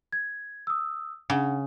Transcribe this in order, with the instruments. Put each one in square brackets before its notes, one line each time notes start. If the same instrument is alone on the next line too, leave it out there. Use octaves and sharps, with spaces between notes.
[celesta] G#6
D#6 E6
[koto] C#3 [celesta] D4 F#5